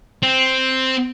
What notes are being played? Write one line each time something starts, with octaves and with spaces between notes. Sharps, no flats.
C4